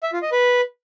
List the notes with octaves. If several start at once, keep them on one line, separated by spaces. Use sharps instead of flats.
E5
F4
D#5
B4